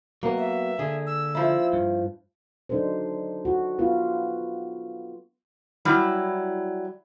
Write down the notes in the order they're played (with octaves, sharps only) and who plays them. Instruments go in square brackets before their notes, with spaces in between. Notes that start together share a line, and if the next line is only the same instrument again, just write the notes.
[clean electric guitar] F#3 B3 [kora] A#3
[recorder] E5
[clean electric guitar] D3 [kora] G#4
[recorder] E6
[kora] F3 E4
[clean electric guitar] G2
[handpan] F#3 D4 D#4 A4 C5
F#4
B3 F4 F#4 B4
[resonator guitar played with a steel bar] F#3 G3 E4